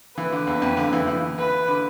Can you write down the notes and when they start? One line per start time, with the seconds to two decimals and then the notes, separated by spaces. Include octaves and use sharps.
0.17 E3 B4
0.32 D3
0.47 E2
0.62 F2
0.77 D3
0.93 E3
1.07 E3
1.38 B4
1.68 D3